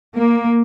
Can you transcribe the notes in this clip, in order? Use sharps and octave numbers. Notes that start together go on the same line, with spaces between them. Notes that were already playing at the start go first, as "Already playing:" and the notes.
A#3